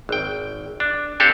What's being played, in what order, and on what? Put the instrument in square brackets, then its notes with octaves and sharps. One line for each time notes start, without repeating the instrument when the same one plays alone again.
[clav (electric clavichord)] G#1 G5
D4
C4 D4 G4 A4 C5 F5